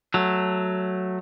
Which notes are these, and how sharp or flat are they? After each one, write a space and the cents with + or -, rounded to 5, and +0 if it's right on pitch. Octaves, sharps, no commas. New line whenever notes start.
F#3 +0 A3 +0